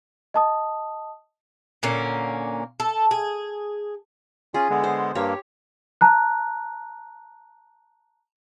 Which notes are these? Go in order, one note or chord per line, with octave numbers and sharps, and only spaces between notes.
D#5 A5 D#6
A#2 D3 A#3 C#4
A4
G#4
C#4 F4 G#4
D3 G#3 B3
C5
G2 A#3 G4 C#5
A5 A#5 F#6